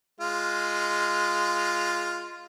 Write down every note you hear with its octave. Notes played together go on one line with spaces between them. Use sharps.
G#3 F4